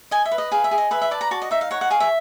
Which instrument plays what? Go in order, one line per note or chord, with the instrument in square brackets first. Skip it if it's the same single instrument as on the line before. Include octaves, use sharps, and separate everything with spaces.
[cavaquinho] D#5 G#5
E5
B4
D#5
G#4 F5
E5
G#4
D#5
B4 E5
E5
D5 A5
A#5
F#4 A5
D#5
D#4 E5
F5
C#5 F#5
F#5
G#4 F5
E5